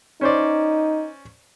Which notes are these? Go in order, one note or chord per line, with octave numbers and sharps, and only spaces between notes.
C#4 D#4 C5 D5